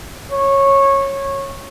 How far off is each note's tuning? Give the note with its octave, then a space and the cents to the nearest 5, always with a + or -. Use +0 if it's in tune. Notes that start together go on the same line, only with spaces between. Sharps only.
C#5 -15